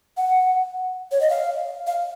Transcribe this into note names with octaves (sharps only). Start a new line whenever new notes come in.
F#5
C#5
D#5
F5
F5